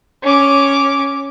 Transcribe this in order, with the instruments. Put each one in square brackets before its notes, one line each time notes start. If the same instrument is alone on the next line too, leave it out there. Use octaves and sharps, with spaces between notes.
[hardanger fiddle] C#4 D6